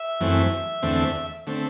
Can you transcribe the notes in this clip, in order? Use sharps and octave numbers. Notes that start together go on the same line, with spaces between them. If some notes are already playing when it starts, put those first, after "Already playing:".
Already playing: E5
F#2 E3 A3 C4
E2 D3 A3 C4
D3 A3 C4